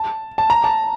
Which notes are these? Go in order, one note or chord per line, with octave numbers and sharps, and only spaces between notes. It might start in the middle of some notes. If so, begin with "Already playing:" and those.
Already playing: A5
A5
A#5
A5